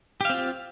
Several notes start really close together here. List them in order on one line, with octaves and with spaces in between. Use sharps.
G4 F5 C4 F4